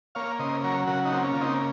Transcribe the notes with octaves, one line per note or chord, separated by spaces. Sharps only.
A#3 C#5 F5
C#3 C5 D#5
F#3 A#4 C#5
C#3 F#4 A#4
D#4 F#4
A#3 C4
C#4
C#3 F4
C4 D#4